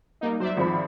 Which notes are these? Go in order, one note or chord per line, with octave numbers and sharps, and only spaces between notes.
G3 A#3 D#4
F#3 C5 D5 E5
G#1 F3 B5